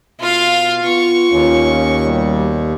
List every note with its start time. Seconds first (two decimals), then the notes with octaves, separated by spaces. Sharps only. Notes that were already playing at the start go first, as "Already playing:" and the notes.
0.20 B2 F4 F5
0.84 B3 F4 C#6
1.32 D#2 C#4
2.05 B2 G3